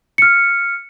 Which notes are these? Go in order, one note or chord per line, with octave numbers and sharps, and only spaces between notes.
F6 C#7